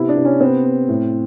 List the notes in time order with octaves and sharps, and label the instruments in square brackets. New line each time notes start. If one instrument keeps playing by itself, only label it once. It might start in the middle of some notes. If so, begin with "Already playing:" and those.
Already playing: [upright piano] C3 B3 E4
D4
C3
C#4
B3 C4
B3
A2